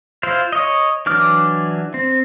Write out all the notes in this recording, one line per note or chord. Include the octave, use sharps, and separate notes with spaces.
E4 F4 C5 F5
C#5 D#5
E3 F#3 D4 D6 F6
C4